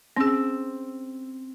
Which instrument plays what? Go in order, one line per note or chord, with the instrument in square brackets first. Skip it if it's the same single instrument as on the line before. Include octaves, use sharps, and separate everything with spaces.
[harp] C4 E6 [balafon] C#4 G#4